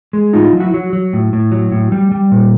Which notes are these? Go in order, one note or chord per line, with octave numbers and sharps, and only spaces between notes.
G#3
A2 D#4 F4
F#3
E4 F#4
F#3
F#3
A2
A2
F#3
A2
G3
G3
A#2